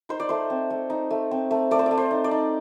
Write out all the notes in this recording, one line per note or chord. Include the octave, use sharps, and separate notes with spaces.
D#4 C5
D5
A3 C5
C4
A3
D#4
A3
C4
A3
A3 D5
C5
A3 D5
C5
D#4
D5
D#4